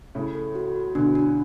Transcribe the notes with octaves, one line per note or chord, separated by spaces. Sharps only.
A2 C#3 A4
A4
F#4
F#4
B2 D3 D4
D4